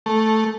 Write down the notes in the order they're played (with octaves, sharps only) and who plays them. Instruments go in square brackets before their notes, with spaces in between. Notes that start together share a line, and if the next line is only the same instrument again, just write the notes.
[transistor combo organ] A3